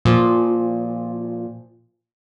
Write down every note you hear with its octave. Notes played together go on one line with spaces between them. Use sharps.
A#2 F3